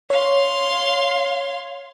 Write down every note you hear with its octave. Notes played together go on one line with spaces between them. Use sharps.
C#5 F5 C6